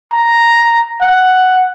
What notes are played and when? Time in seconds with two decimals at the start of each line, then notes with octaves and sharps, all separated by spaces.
0.13 A#5
1.01 F#5